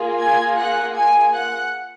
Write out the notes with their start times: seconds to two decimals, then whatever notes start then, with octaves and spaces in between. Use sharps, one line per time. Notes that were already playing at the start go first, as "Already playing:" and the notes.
Already playing: A#3 F4 G#4
0.19 G#5 G#6
0.57 F#5 F#6
0.95 G#5 G#6
1.34 F#5 F#6